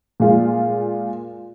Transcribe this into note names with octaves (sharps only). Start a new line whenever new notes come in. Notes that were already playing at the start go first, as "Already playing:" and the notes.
A#2 G#3 F4